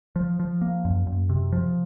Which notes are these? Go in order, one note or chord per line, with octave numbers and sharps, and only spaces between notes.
F3
F3
A#3
F#2
F#2
C3
F3